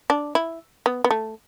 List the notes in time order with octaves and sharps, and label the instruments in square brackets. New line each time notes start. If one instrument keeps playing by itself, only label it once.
[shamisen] D4
E4
B3
B3
A3